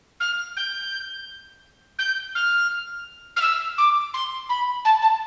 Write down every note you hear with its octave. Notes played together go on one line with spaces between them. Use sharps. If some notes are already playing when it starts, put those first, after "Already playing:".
F6
G6
G6
F6
F6
E6
D6
C6
B5
A5
A5